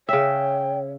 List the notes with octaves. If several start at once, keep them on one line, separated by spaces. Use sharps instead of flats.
C#3 C#5 E5 G5